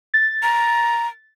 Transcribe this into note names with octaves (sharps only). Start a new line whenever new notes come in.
A6
A#5